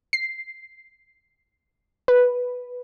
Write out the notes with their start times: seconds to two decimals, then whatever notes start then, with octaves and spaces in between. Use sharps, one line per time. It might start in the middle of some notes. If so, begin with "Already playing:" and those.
0.13 C7
2.08 B4